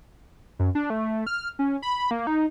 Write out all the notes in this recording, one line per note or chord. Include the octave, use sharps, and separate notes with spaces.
F#2
D4
A3
F6
C#4
B5
A#3
D#4